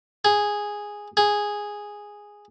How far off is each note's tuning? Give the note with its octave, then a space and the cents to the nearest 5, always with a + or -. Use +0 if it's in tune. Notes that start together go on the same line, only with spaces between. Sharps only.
G#4 -5
G#4 -5